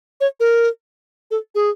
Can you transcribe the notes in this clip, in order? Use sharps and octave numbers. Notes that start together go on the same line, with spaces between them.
C#5
A#4
A4
G#4